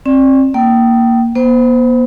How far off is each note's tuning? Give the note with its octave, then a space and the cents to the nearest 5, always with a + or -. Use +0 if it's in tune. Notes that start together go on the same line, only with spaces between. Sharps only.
C4 +35 D5 +0
A#3 +0 G5 -20
B3 -45 C5 -20